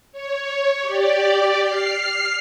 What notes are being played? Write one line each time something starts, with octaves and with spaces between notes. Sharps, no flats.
C#5
G4 D5
F6 C7